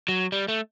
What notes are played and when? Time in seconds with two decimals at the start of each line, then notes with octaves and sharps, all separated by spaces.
0.08 F#3
0.32 G3
0.48 A3